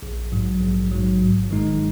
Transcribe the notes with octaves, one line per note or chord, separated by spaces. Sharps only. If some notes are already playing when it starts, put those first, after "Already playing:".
A#1
G#2 F#3
A#1
G#2 F#3
G#1
G#2 D#3 G#3 D#4